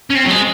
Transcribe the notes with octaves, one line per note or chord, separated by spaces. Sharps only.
C#4
C4
F#3
G#3